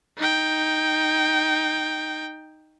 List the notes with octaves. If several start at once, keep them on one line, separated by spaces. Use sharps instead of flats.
D#4 G5